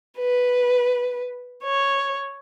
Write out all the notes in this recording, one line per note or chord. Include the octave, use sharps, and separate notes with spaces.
B4
C#5